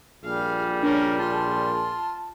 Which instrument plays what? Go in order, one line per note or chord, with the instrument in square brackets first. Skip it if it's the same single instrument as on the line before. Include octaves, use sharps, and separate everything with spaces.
[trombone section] A#1 A#2 G#4 [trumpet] G3 [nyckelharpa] F5
[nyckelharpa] C#4 A#4 [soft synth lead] D4
[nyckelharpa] F4 C6 [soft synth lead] A5